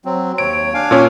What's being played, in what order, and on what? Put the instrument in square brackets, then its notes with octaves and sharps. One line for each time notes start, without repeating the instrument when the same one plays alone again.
[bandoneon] F#3 C4
[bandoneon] D#2 C#5 [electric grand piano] D7
[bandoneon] D4 F5 G#5
[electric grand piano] A#2 C#4